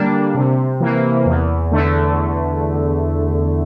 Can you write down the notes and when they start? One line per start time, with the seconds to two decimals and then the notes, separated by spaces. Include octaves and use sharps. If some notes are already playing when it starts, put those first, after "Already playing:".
Already playing: D3 G3 A#3 D4
0.35 C3
0.80 E3 A#3
1.26 E2
1.71 D3 A3